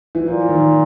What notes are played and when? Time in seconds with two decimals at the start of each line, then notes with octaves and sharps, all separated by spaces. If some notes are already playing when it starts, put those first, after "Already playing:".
0.15 E3
0.27 A#2 F3
0.49 D#3